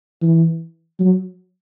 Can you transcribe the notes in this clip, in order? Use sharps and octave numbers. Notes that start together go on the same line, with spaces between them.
E3
F#3